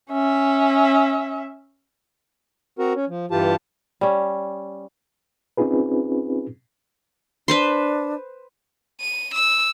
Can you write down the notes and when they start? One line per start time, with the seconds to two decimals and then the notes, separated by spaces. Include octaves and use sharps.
0.11 C#4 E5
2.79 C4 F#4 A#4
2.95 C#4
3.09 F3
3.31 G2 E3 F4 G4 A5
4.01 G3 C#4
5.57 C4 C#4 D#4 F4 G#4 B4
7.48 D4 B4 C5 C6
9.00 D#7
9.34 E6